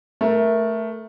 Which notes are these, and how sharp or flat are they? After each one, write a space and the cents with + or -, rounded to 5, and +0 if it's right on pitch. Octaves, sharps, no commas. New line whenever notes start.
A3 +0 A#4 +15